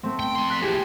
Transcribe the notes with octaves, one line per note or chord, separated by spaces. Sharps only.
A3 C4
G5
F2 C6
F#6 B6
E3 F3 G4 G#4